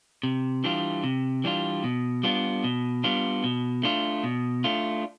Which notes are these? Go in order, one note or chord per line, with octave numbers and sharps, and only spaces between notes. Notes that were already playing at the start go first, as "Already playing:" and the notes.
C3
E3 G3 D4 F4
C3
E3 G3 D4 F4
B2
G3 B3 D4 F4
B2
G3 B3 D4 F4
B2
A3 D4 F4
B2
A3 D4 F4